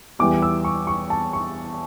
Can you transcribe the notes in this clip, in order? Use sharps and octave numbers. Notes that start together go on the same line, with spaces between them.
E2 E3 G3 D6
E6
C#6
C#6
A5
C#6